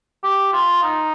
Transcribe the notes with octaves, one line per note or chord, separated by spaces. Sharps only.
G4
F4
D#4